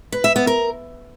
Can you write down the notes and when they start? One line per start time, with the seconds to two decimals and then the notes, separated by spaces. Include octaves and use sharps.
0.12 B4
0.24 E5
0.36 B3
0.47 A#4